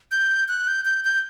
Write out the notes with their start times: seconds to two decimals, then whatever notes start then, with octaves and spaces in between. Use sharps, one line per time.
0.11 G6
0.48 F#6
0.68 G6
0.85 G6
1.05 G6